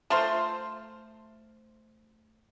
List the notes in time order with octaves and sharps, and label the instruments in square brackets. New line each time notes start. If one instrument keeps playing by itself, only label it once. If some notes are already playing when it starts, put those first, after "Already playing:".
[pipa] A3 F4 C5